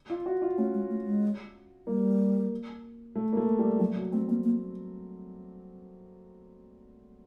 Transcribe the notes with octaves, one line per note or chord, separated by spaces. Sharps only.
F4
F#4
F4
A3 C#4
G#3
A3
G#3
G3 A#3
A3
A#3
A3
G3
F#3 G3
F#3
A3 C4
A#3 C4
A#3